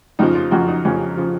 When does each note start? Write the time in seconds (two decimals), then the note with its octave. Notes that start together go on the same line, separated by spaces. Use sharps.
0.19 F2 C#3 F3 D#4
0.35 F3 F4
0.51 F2 C#3 F3 F#3 F#4
0.68 D#4
0.85 F2 C#3 F3 C#4
1.17 C#3 F3